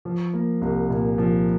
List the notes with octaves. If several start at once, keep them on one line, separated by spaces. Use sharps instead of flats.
F3
A#3
C2
A#2
F3